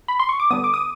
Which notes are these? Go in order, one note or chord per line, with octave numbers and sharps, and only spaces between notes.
B5
C6
C#6
D6
D3 G3 B3 D#6
D6
D#6